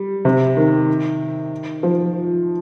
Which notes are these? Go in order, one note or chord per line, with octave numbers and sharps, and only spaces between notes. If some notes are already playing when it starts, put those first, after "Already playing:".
Already playing: G3
C3
D#3
F3